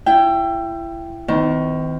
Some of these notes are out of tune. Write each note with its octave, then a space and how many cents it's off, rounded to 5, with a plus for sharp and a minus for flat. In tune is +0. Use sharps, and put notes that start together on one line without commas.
E4 +30 G5 +0
D#3 +25 C4 -40